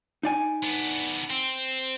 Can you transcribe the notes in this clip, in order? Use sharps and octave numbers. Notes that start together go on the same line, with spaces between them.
D#4 D5 G#5
B3 D4
C4